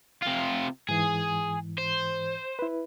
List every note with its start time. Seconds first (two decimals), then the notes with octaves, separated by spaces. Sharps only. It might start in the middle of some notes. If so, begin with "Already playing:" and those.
0.22 C3 F4
0.89 G#2 E3 G#4
1.78 C5
2.59 E4 B4